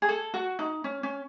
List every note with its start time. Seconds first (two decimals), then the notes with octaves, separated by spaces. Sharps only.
0.02 G#4
0.09 A4
0.34 F#4
0.59 D#4
0.84 C#4
1.03 C#4